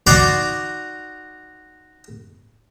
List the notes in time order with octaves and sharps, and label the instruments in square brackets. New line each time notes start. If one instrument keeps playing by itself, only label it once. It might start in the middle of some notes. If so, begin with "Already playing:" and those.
[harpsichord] D#4 F#4 D5 A#5 C6 D6